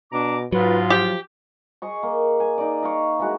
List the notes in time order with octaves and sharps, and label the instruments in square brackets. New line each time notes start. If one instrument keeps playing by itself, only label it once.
[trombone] B2 [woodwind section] D4 A#5 D6
[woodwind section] G#2 F4 [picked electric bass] F#3 [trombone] B4
[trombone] F3 [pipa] G4
[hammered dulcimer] G#4 D#5 C#6
A#3
G#5
D#4 D5
D#5 F5 C#6
E3 G#3 F#4